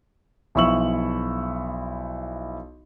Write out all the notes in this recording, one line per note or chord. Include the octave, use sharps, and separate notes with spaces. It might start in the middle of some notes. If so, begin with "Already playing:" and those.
B1 F3 E4 C#6 E6 F#7